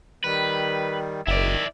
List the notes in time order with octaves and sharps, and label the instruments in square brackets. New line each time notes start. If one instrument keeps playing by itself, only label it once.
[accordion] D#3 G3 [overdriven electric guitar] B4
[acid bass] F#1 [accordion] D#3 E5 [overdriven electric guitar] E4 D5